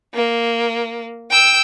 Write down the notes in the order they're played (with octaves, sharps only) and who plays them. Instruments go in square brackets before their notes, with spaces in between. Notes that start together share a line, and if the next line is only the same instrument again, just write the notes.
[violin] A#3
G5 E6